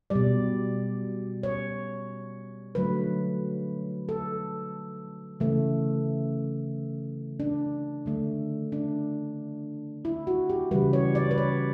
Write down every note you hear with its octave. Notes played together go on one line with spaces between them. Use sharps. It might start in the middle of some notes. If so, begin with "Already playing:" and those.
B2 G3 D5
C#5
D3 F#3 A3 B4
A4
C#3 E3 A3
D4
D3 A3
D4
E4
F#4
G4
C#3 E3 G3 B4
C#5
D5
B4
C#5